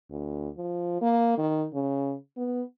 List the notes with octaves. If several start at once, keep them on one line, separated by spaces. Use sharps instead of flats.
D2
F3
A#3
D#3
C#3
B3